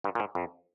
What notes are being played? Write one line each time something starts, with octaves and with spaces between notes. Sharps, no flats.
G2
A#2
G#2
F2